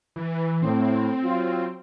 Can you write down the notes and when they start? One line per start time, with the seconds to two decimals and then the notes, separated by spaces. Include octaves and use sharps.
0.16 E3
0.62 A2 C4
1.23 F#3 F4